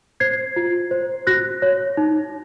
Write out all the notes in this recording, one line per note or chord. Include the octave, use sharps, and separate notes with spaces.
C5 G#6 C7
F4
C5
F#4 F#6 A#6
C#5
D#4